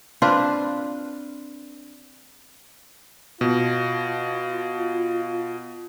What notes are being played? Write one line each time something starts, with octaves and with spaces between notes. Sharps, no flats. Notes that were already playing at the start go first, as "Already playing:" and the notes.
C4 D4 F4 B4
B2 F4